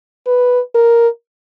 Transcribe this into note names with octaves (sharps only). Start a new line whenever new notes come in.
B4
A#4